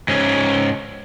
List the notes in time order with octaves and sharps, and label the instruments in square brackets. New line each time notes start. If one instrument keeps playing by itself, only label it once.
[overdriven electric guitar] G#2 C#4